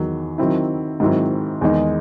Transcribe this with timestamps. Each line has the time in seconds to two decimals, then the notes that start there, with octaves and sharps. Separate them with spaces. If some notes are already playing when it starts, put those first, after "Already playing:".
Already playing: E2 D#3 F#3
0.38 D#3 F#3 C4 E4
1.00 G#2 D#3 F#3 C4 E4
1.61 E2 D#3 G#3 D#4